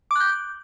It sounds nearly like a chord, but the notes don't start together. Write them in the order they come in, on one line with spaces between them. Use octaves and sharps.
D6 F#6 G6